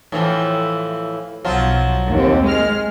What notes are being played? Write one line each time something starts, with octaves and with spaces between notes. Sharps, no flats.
A2 E3 F3
B1 F3 F#3 F4
D#2 C4
G#3 F6